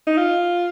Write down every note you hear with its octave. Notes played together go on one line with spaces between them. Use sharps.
D#4
F4